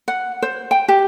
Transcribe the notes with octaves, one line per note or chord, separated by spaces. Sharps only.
F#5
C5
G5
G4